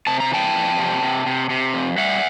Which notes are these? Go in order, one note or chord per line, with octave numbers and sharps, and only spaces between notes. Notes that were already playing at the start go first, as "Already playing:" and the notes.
C3 A5
A#5
E3 G5 A5
F2
C3
C3
C3
C3
F2
G3 E5 F#5